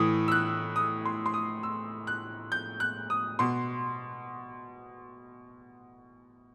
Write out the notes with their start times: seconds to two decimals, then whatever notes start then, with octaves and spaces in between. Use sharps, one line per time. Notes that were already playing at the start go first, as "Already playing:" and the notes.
Already playing: A2 E3 D#6
0.28 E6
0.32 F#6
0.76 D#6
1.05 C6
1.26 C6
1.34 D#6
1.63 E6
2.07 F#6
2.52 G6
2.80 F#6
3.10 D#6
3.39 B2 C6